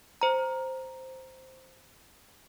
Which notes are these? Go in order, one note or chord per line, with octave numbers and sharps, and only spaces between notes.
C5 A#5